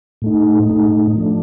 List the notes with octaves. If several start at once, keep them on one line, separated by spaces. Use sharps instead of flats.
A2 A3 D#4
A2 A3 D#4
F3 A3 D4